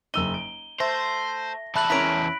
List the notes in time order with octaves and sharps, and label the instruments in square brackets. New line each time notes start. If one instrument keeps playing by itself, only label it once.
[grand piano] F#1 E6 D#7 [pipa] D#4 [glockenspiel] G7
[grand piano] D7
[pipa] A3 [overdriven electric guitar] C5 [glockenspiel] A#6
[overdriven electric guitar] E2 A5 [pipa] A3 [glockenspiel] B5 F#6 F#7
[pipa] G#3 A#4 C#5 [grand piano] C#4 E4 [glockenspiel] B6 D7